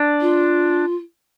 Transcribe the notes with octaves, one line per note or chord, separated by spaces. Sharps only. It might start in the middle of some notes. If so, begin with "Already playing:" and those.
Already playing: D4
F4